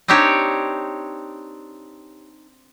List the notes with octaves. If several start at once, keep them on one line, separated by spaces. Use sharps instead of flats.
C4 D4 D#4 G4 C#5